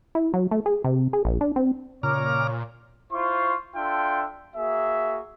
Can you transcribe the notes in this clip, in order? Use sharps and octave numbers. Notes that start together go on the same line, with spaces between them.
E4
F#3
A3
G#4
C3
G#4
A#1
D4
C4
A#2 C#3 C#5 A#5 D6 F6
E4 F4 C5 C6 C#6
D4 F4 A4 E5 G5 C6
A#3 F#4 G#4 E5